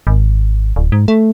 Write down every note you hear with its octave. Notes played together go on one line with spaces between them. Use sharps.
G#1
D1
G#2
A3